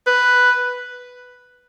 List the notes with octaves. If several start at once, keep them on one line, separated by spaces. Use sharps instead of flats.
B4